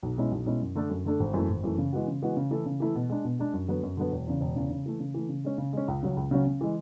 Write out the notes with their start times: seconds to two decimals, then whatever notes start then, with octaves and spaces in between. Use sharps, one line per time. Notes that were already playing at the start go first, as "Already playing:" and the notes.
0.03 B1
0.18 B2 G#3 C#4 E4
0.31 B1
0.46 B2 G#3 C#4 E4
0.61 F#2
0.75 D3 A3 D4 A4
0.90 F#2
1.05 D3 A3 D4 A4
1.20 G#1
1.34 F#2 E3 A3
1.49 G#1
1.63 F#2 E3 A3
1.78 C#3
1.93 E3 G#3 B3 F#4
2.08 C#3
2.22 E3 G#3 B3 F#4
2.37 C#3
2.51 E3 A3 E4 A4
2.66 C#3
2.80 E3 A3 E4 A4
2.95 B2
3.09 G#3 D4
3.25 B2
3.39 G#3 D4
3.53 F#2
3.68 D3 F#3 B3
3.83 F#2
3.97 D3 F#3 B3
4.12 E1
4.27 E2 C#3
4.41 E1
4.56 E2 C#3
4.70 C#3
4.86 E3 A3
5.00 C#3
5.14 E3 A3
5.29 C#3
5.44 G#3 C#4
5.58 C#3
5.73 G#3 C#4
5.88 C#2
6.03 C#3 F#3 C#4
6.17 C#2
6.31 C#3 F#3 C#4
6.46 C#3
6.61 E3 G#3